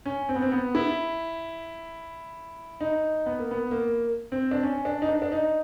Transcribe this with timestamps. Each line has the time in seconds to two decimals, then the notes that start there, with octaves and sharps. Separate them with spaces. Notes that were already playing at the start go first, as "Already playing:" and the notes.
0.06 C#4
0.29 C4
0.35 B3
0.42 C4
0.52 B3
0.75 E4
2.81 D#4
3.26 B3
3.39 A#3
3.51 B3
3.71 A#3
4.32 C4
4.51 D4
4.63 C#4
4.85 D4
5.02 D#4
5.09 D4
5.22 D4
5.32 D#4